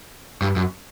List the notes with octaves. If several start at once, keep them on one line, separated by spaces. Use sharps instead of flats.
G2
F#2